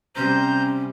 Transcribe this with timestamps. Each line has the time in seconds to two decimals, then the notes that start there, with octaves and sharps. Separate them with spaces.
0.16 C3 G3 C#4 C5 A#5 G6